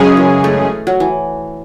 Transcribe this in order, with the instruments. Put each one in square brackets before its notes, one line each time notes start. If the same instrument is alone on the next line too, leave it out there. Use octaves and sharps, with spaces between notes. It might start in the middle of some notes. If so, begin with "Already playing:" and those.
Already playing: [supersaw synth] F#2 C#3 G#3 C#4 G#4
[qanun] E3
A3
F#3
E3